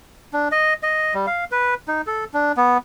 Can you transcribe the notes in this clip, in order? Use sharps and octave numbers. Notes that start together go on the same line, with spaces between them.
D4
D#5
D#5
G3
F5
B4
D#4
A4
D4
B3